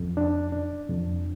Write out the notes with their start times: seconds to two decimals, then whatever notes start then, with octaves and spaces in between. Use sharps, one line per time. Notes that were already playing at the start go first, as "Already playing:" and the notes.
Already playing: F2
0.17 D4
0.52 D4
0.89 F2